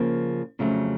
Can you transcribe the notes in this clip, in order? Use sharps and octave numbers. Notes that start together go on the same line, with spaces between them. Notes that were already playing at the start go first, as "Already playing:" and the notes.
Already playing: C#3 F3 A#3
F2 C#3 F#3 A3